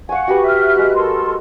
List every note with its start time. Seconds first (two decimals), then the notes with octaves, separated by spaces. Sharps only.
0.09 F5 F#5 G#5 C#6
0.28 F#4 G4 B4
0.44 E5 F6 F#6
0.76 G#3 F#4
0.95 A4 A#4 C6